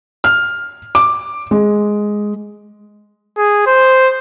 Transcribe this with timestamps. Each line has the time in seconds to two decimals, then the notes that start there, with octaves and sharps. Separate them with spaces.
0.24 F6
0.95 D6
1.51 G#3
3.38 G#4
3.67 C5